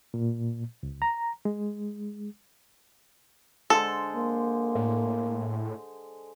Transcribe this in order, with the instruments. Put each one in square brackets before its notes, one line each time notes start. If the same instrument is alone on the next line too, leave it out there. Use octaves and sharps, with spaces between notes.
[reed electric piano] A#2
C#2
A#5
G#3
[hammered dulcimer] D3 G#3 C5 [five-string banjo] A4
[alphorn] A#3
[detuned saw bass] A2